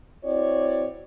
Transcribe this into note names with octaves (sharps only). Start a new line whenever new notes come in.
C4 E4 F#4 C#5 D5